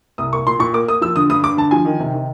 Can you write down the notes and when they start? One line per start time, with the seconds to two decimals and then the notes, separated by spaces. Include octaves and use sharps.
0.18 C2 D#6
0.33 A#3 C#6
0.47 A#2 C6
0.59 A#2 C#6
0.73 A#3 D6
0.88 A#3 D#6
1.01 F3 E6
1.16 D3 D#6
1.30 G2 D#6
1.43 G2 D6
1.57 D3 A5
1.71 F3 G#5
1.85 D#3
2.00 C3
2.14 D#3